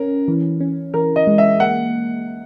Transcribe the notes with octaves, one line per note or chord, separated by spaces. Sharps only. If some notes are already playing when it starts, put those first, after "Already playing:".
Already playing: C#4 A#4
E3
C#4
E3 A#4
D#5
G#3
E5
A#3 F#5